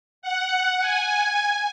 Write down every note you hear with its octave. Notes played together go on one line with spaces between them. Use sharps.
F#5
G#5